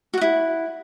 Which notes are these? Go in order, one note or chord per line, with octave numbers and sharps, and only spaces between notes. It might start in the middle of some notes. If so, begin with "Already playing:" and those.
E4 F#4 F#5